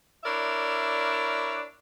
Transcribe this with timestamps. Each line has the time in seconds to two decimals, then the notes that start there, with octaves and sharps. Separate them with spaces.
0.24 D4 E4 A#4 C#5 D5 E5